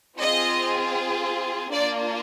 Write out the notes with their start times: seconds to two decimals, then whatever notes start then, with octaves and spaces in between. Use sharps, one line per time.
0.19 C4 F4 G#4 D#5
1.72 A#3 D4 F4 D5